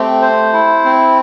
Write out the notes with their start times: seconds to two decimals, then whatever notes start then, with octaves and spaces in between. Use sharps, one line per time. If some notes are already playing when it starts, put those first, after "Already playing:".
Already playing: A3 C4 G4
0.22 C5
0.53 E4
0.85 C4